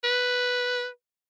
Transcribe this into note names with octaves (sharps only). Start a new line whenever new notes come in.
B4